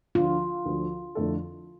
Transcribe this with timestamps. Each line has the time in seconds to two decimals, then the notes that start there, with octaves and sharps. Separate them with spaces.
0.15 D2 D3 F3 F4
0.66 D2 D3 F3
1.15 F2 D3 A3 E4 A4